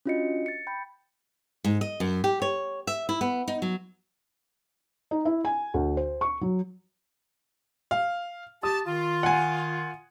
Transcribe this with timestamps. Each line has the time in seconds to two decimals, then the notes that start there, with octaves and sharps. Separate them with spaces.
0.06 C#4 D4 F4 F#4 D#5 C#7
0.46 A6 C#7
0.67 G5 B5 G6
1.64 G#2
1.81 D#5
2.00 F#2
2.24 G4
2.42 C#5
2.87 E5
3.09 E4
3.21 B3
3.48 D#4
3.62 F#3
5.11 D#4
5.25 E4
5.45 G#5
5.74 D2
5.97 C5
6.21 C#6
6.41 F#3
7.91 F5
8.63 G4 A5 D#6
8.86 D#3 F4
9.23 F#5 G#5